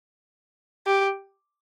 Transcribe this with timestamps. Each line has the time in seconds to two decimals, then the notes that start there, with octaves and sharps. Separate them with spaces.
0.87 G4